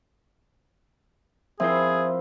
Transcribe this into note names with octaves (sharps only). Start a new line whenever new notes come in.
F3 C4 E4 G#4 A#4 C5 E5